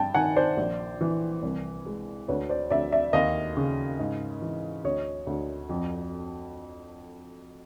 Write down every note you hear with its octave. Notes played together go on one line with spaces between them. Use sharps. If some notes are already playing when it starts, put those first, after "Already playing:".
Already playing: G2 G5 A5
D#3 F#5 G#5
C5 D5
A#1
E3
C2
G#3
D2 B4 C#5
C5 D5
D2 D5 E5
D5 E5
D#2 D#5 F5
C#3
G#2
E3
D2 C#5 D#5
D2
F2